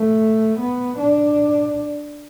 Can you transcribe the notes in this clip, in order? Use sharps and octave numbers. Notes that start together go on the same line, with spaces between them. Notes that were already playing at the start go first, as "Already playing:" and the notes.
Already playing: A3
B3
D4